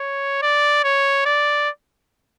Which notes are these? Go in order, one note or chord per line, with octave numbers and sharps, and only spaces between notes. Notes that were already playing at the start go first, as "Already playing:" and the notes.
Already playing: C#5
D5
C#5
D5